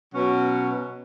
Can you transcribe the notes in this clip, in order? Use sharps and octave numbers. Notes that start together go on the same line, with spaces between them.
B2 F#3 C#4 F#4